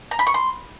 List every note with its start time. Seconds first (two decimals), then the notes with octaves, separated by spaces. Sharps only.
0.11 A#5
0.19 B5
0.27 C#6
0.34 C6